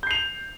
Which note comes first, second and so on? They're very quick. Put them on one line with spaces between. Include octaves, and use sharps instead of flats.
G6 C7 F7